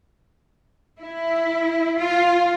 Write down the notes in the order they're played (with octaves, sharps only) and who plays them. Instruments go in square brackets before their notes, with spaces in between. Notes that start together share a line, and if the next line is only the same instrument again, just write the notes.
[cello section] E4
F4